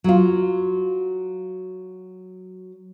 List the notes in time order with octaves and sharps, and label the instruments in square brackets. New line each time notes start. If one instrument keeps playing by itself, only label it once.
[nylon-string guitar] F#3 F4